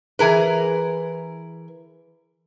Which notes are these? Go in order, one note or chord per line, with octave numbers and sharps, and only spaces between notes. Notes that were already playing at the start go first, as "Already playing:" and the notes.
E3 G#4 A#4 B4